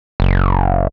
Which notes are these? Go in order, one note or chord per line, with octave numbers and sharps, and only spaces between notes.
F#1